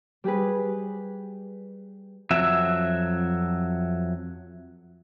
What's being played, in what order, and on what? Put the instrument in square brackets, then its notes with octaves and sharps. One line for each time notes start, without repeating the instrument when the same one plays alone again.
[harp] G3 G4 G#4 B4
[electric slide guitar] F2 F#3 E5